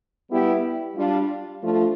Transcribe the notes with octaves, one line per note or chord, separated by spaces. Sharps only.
G3 B3 E4 G4
G3 D4 F4
F3 A3 D4 F4